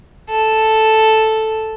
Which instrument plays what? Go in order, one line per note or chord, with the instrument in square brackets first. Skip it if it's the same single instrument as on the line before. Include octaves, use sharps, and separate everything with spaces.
[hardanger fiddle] A4